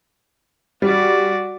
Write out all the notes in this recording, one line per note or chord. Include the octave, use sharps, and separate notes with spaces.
G3 F#4 D5